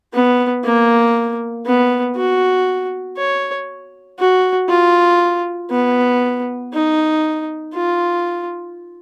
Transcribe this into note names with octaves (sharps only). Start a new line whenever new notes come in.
B3
A#3
B3
F#4
C#5
F#4
F4
B3
D#4
F4